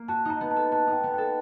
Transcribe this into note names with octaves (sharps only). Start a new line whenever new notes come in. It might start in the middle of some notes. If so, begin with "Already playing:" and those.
Already playing: A#3
F#4 A5
D#4 A#5
B3
A5
A4
F#4 A5
D#4 G5
B3
A4 G5